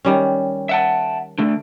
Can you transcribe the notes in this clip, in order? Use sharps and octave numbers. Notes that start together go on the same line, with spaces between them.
D#3 G3 C#4
E5 F#5 A5
D3 A3